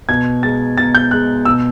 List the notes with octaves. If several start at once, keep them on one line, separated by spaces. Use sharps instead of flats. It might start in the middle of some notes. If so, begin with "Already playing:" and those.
B2 G#6
G#3 A6
B2 A6
G6
G#3 F#6
B2 E6